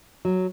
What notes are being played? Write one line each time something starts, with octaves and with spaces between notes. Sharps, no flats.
F#3